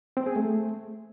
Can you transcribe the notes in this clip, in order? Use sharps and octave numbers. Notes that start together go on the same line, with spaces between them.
C4
G#4
A3